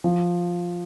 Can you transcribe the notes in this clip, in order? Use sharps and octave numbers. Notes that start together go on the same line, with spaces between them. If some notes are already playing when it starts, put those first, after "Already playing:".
F3